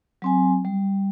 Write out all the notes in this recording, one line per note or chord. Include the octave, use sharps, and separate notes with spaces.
F#3 C4 G#5
G3